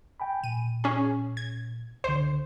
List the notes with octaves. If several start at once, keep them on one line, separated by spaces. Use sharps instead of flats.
G5 G#5 B5
A#2 D#7
C#4 G#4
G#6
C#2 D3 C5